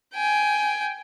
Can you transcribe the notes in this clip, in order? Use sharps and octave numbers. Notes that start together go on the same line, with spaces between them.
G5 G#5